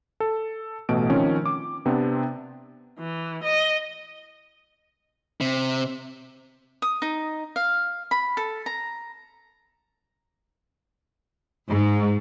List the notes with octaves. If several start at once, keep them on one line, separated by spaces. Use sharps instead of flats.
A4
A1 B2 A3 D7
D#3 F3 C4 C#4
D6
C3 B3 C4 D4
E3
D#5
C3
D#6
D#4
F5
B5
A4
A#5
G#2